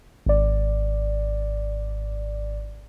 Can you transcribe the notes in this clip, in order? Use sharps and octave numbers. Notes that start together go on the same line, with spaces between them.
G#1 D5